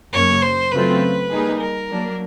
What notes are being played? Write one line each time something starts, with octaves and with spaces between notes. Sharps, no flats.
F#2 C#3 F#3 A#3 C#5
C5
C#3 F#3 A3 C4 F4 B4
G3 A#3 D#4 G#4
A#4
F#3 A#3 D4